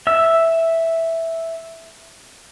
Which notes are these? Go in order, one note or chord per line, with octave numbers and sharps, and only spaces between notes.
E5 E6